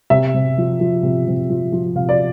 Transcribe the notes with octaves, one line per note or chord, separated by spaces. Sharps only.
C3 E5
C3
F3
F3
C3
C3
F3
F3
C3 F5
D5